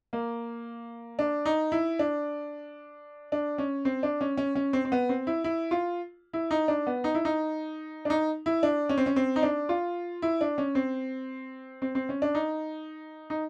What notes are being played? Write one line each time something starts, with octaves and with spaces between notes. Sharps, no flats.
A#3
D4
D#4
E4
D4
D4
C#4
C4
D4
C#4
C#4
C#4
C4
C4
B3
C4
E4
E4
F4
E4
D#4
D4
B3
D#4
E4
D#4
D4
D#4
E4
D4
C#4
C4
C#4
C4
D#4
D4
F4
E4
D4
C#4
C4
C4
C4
C#4
D4
D#4
D#4